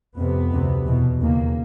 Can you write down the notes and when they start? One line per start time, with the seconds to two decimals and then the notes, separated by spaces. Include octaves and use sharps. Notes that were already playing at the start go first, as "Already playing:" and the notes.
0.16 F2 C3 B3
0.51 D2 C3
0.87 E2 B2
1.21 D#2 C#3 A#3